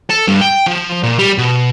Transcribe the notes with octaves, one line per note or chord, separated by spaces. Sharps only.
A4
G2
G5
F3
A#2
G3
B2